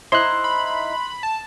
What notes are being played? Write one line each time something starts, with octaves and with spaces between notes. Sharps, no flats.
D#4 E4 C5 C6 F#6
B5
A5